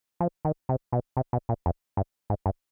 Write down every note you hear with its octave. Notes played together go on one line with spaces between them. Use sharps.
F3
D#3
C3
B2
C3
B2
A#2
F2
G2
G#2
G2